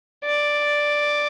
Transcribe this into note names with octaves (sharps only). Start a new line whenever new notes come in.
D5